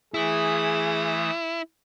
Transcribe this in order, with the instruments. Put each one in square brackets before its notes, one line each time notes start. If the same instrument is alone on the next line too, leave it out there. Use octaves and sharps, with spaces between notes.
[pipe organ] E3 A3 D#6 [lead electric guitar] E4 [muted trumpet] G#4